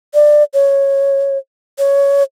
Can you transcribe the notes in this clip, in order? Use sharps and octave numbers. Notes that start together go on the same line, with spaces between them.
D5
C#5
C#5